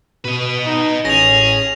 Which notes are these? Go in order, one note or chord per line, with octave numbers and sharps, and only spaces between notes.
B2 B4 D#5
D#4
A1 C#4 G#4 A#6 F7